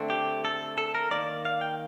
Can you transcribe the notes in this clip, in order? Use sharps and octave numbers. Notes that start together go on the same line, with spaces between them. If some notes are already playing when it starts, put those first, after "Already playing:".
Already playing: D3 A3 C4
G4
A4
A4
A#4
D#3 A#3 D5
F5
G5